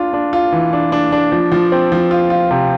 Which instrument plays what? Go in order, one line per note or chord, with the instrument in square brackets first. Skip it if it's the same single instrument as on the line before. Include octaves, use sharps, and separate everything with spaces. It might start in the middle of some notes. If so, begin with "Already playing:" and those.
Already playing: [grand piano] D4 F4
D4
F4
E3
D4
D4
D4
F3
F3
C4
F3
F4
F4
C3